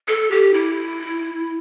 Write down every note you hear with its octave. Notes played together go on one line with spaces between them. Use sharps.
A4
G4
E4